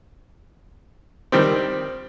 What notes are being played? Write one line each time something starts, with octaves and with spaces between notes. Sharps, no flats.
D#3 G3 C4